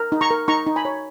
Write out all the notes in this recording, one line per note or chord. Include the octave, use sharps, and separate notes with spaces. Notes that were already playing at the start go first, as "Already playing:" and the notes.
Already playing: A#4
D#4
A#5 C#6
A#4
D#4 A#5 C#6
D#4
G#5 B5
C#5